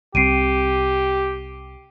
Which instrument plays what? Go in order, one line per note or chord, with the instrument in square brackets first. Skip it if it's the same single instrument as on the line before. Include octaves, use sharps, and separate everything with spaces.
[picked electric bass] C2 C3 [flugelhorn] G4 [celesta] C7 D7 D#7